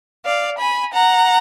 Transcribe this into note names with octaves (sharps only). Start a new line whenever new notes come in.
D5 F5
G#5 B5
F#5 A#5